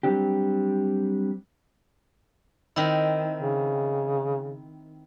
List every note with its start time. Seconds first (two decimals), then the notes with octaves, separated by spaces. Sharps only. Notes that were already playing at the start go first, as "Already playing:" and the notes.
0.03 F#3 G3 C4 D4 G4
2.76 D#3 C4 E4
3.40 C#3